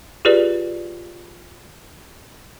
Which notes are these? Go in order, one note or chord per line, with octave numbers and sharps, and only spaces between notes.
F4 G4 G#4 B4 D5